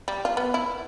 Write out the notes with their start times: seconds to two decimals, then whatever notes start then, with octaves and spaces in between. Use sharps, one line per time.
0.08 G3
0.25 F4
0.37 B3
0.54 E4